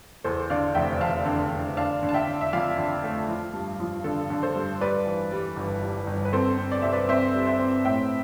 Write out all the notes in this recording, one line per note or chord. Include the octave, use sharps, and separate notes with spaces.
E2 A4 C5
D3 D5 F5
F1 E5 G5
F1 F5 A5
D3
D3
D4 F5 A5
D3
A5
E5 G5
D3
E5
F2 D5 F5
D3
A3
F3
G2
F3
D3 A4
D3
A4 C5
G2
G3 B4 D5
E3
G3
G1
G3
G1
B4
C4 A4 C5
C4
D5
C2 E5
B4 D5
C4 C5 E5
G3
C5 E5
C4
A2 E5 G5